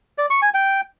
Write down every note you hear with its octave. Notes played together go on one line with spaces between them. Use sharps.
D5
C#6
G#5
G5